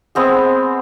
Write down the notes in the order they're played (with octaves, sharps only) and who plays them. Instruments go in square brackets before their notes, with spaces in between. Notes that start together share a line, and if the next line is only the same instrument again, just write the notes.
[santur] G#3 B3 C4 G#4